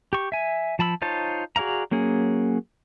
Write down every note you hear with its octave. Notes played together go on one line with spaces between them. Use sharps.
G4 C#6
E5 G#5
F3 A5 B5 E6
D#4 F4 C5 C#5 A5
F#4 G#4 D5 F5 A#5
F#3 A#3 C#4 G#4